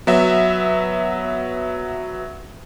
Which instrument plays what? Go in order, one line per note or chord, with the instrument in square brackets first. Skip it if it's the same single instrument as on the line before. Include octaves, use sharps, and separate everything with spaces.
[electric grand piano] F#3 B3 E5